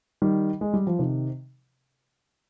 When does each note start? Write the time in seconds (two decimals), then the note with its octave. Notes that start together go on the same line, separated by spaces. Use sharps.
0.22 D#3 G3
0.61 G#3
0.73 G3
0.87 F3
0.99 C3 D#3